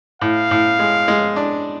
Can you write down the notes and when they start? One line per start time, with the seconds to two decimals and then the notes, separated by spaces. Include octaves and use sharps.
0.21 A2 F5
0.51 A2
0.79 G#3
1.08 G#3
1.36 D4